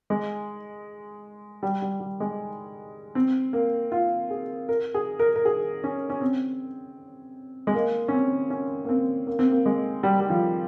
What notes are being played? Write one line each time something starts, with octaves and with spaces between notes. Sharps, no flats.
G#3
G3
G3
G3
G#3
C4
A#3
F4
G#4
A#4
G#4
A#4
A#4
G#4
C#4
C#4
C4
G#3
A#3
C#4
C4
C#4
A#3
C4
A#3
C4
A#3
G#3
G3
G3
F3